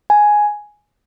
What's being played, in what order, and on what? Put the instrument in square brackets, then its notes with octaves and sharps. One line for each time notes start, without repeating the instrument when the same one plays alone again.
[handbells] G#5